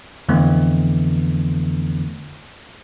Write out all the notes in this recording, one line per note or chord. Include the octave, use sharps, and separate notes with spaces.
F2 D3 E3 A3 B3